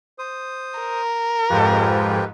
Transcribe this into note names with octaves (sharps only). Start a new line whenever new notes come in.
C5 D#6
A#4
F2 G#2 F4 G4 B4